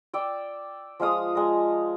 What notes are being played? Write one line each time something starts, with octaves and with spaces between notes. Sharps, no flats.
D5 G5 E6
F3 G#3 F5 D#6
G#3 A#4